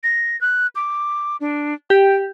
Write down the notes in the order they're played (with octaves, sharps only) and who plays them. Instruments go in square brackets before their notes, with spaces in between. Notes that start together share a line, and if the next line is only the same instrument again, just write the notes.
[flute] A#6
F#6
D6
D4
[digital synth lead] G4 [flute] G5